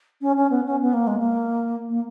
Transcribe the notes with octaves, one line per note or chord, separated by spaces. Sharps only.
C#4
C#4
B3
C#4
B3
A#3
G#3
A#3
A#3